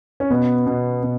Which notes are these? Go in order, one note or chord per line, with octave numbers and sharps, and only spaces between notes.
C#4
B2 B3
B2
B2